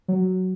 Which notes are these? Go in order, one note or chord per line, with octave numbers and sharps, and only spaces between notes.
F#3